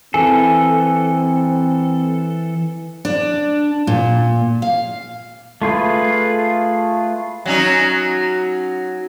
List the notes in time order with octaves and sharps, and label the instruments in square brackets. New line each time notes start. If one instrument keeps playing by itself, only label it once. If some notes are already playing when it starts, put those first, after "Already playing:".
[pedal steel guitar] E3 A4 [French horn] C4 [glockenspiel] G#5
[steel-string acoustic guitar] D4
A#2
F5
[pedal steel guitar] A3 F4 G#4 B4
[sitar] F#3 C#4 D#4